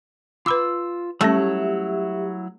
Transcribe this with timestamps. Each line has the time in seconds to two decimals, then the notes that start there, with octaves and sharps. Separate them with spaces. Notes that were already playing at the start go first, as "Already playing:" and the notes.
0.46 F4 B4 B5 D6 E6
1.21 F#3 G3 A3 C#4 E4 G4 C#5 E5